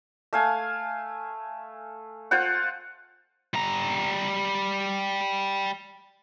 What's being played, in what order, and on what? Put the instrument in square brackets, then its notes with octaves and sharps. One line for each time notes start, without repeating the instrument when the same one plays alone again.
[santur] A3 F5 G#5
F4 C5 F#5
[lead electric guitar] G3 A#5